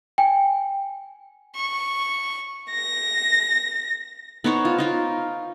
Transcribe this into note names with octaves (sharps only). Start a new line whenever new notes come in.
G5 G#5
C#6
A#6
B3 D#4 C5 C#5
F4
D#4 F4 A#4